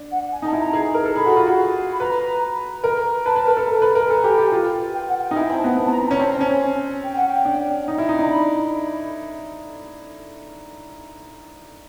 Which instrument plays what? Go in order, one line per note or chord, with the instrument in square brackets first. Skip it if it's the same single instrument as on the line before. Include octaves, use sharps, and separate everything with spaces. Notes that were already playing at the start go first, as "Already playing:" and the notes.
Already playing: [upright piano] D4
[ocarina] F#5
G#5
[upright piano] D#4 [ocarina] A5
[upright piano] E4
[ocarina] A#5
[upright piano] G#4
A#4
A4
[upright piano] G#4 [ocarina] B5
[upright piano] F#4
F4
F#4
[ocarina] B5
[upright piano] B4 [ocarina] A#5
[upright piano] A#4
[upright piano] B4 [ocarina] A5
[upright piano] B4
A#4
A4
A#4
B4
A#4
[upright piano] A4 [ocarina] G#5
[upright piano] G4
G4
F4
[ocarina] G5
F#5
G5
[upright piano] D#4
[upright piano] E4 [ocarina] G#5
[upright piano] C4
[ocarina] A5
[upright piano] B3
B3
[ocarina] A5
A#5
A#5
[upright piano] C#4
[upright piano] C4 [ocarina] A5
[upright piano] C#4 [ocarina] G#5
[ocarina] G5
F#5
G5
[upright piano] D4
D#4
E4
D#4
[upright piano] D4 [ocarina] A#5
[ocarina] B5